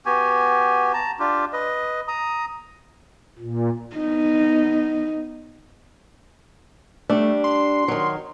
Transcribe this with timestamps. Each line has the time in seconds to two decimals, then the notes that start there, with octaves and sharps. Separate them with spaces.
0.06 B3 F#4 G4 G#5
0.93 A5 A#5
1.19 D4 F4 G4
1.53 B4 D#5
2.08 A#5 D#6
3.39 A#2
3.96 B3 D#4
7.10 G3 A3 D4
7.44 C6
7.88 D#3 F#3